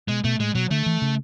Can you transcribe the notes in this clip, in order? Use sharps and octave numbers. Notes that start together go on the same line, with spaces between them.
B2 G#3
B2 A3
A2 G#3
B2 F#3
D3 A3
E3
C#3